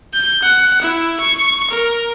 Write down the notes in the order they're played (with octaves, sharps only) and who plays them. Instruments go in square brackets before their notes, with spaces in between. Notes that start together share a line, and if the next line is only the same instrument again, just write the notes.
[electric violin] G6
F#5
E4
C#6
A#4